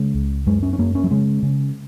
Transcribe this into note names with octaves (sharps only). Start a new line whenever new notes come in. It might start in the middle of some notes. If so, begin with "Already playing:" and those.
Already playing: C#3 G#3
C#2
F#2 G#3
C#4
C#4
F#2 A#3
C#4
F#3
C#3 G#3
C#3